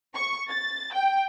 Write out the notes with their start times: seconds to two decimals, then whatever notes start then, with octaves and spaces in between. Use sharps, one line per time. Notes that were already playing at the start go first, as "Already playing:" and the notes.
0.15 C#6
0.49 A6
0.93 G5